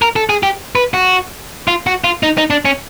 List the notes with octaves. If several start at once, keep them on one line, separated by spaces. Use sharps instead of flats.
A#4
A4
G#4
G4
B4
F#4
F4
F#4
F4
D#4
D#4
D4
C#4